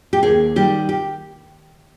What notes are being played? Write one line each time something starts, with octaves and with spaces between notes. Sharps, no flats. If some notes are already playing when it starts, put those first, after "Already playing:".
G4
D#2 G#4
D#3 G3 G4
G4